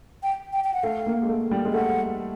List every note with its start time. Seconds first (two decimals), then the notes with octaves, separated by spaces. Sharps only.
0.23 G5
0.53 G5
0.64 G5
0.74 F#5
0.83 A3 F5
1.06 A#3
1.23 G#3
1.29 A3
1.51 G3
1.65 G#3
1.74 A3 F#5